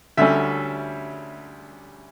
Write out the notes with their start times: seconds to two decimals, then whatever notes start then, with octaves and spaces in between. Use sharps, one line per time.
0.17 D2 D3 G3 C#4 E5